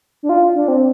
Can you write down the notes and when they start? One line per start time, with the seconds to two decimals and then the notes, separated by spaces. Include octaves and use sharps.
0.23 D4
0.29 F4
0.56 D4
0.68 C4